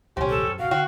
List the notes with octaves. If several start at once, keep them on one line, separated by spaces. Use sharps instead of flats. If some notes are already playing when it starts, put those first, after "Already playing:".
D#1 C2 C4 C#4 G4
A4
F#2
A2 C3 F#4 F5
D3 F#4 G5